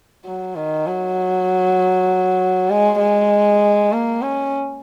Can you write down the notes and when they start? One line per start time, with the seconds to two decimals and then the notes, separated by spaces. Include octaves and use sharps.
0.25 F#3
0.56 D#3
0.87 F#3
2.70 G#3
3.00 G#3
3.92 A#3
4.22 C#4